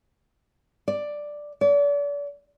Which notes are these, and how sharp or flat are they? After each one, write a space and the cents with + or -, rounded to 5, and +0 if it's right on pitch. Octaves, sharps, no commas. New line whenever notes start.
D5 +5
D5 -40